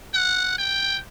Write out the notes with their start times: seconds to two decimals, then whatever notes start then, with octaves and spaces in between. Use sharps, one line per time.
0.14 F#5
0.58 G5